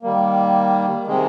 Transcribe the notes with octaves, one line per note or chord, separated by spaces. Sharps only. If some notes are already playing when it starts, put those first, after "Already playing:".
D#3 G3 A#3
C3 D#3 G#3